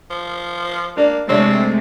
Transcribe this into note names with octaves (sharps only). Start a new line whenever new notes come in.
F3
A#3 D4
C3 G#3 A3 C4 D4 C5 C#5